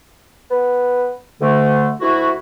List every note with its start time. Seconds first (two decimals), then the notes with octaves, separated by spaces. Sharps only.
0.50 B3
1.41 D2 D3 A3
2.01 D2 E4 F#4